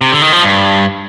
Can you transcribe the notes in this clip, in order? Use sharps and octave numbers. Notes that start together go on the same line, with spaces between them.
C3
D3
D#3
F3
G2